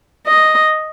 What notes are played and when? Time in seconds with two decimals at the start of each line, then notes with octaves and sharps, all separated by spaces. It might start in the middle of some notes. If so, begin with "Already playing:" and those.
0.27 D#5